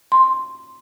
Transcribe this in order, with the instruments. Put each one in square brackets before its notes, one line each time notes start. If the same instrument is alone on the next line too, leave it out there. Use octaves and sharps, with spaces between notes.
[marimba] C6